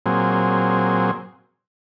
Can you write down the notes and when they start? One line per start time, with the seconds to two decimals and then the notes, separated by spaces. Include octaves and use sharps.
0.06 A#2 F#3 C4 G#4